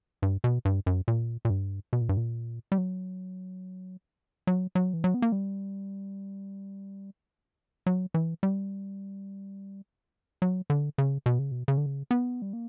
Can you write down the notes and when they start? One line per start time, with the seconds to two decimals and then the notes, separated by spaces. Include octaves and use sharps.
0.22 G2
0.44 B2
0.65 G2
0.86 F#2
1.08 A#2
1.45 A#2
1.50 G2
1.93 B2
2.01 A#2
2.09 G2
2.17 A#2
2.72 G3
2.78 F#3
4.47 F#3
4.75 F#3
4.93 E3
5.04 F#3
5.14 B3
5.22 A#3
5.32 G3
7.86 F#3
8.14 E3
8.43 G3
10.42 F#3
10.70 D3
10.98 C#3
11.26 B2
11.39 C#3
11.51 B2
11.68 C#3
11.77 D3
11.86 C#3
12.11 B3
12.42 G3
12.53 A#3